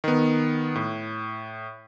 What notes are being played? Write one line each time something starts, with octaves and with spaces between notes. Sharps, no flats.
D#3 B3
A2